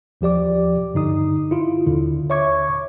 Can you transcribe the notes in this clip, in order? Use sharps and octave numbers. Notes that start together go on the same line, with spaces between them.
D#2 F3 G4 D5 D6
G2 D3 D#4 D#6
E4 F4
D#2 D3
C#5 E5 C#6 D6 G#6